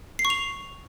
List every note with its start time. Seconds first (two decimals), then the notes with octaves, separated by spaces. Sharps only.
0.19 C7
0.25 C#6
0.30 F7